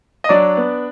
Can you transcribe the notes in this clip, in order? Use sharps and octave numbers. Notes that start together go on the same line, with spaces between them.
D#5
F#3 D4 D5
B3